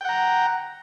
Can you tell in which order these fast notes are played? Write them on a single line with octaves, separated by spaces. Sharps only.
G5 F#5 A#5